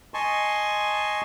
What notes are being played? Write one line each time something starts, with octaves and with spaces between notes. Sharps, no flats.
D#5 G#5 A5 C6 C#6